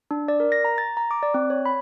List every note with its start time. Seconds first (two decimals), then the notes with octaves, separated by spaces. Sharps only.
0.11 D4
0.28 D5
0.40 A#4
0.52 A#6
0.65 A#5
0.78 A6
0.97 A#5
1.11 D6
1.23 D5
1.34 C4
1.50 C#5
1.65 B5